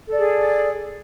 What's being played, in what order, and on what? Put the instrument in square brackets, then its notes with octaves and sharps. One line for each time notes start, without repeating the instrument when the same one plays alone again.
[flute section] A4
D5
G#4